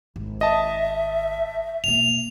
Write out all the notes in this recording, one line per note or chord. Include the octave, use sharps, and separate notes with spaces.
G#1
D#5 E5 A5
B2 A#3 F7